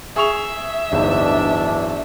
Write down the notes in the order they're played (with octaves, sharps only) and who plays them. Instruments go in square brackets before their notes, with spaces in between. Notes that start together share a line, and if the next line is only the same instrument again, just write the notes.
[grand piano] G#4 C#6 F7 [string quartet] E5
[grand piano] D1 G1 D#4 [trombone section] E3 D4